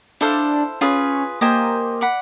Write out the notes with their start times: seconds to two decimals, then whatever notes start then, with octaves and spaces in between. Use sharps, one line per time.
0.21 D4 E4 A4 C5 F5
0.81 C#4 F4 G#4 B4
1.41 A#3 G4 C5 D#5 G#5
2.01 D5 F#5 B5